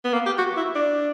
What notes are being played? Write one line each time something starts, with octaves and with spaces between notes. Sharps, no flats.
B3
A#3
G4
F#4
E4
D4